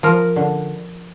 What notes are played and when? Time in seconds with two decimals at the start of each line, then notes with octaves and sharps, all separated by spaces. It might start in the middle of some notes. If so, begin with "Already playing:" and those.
0.03 F3 A#4
0.36 D3